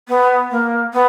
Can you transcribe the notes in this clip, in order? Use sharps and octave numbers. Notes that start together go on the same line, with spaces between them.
B3
A#3
B3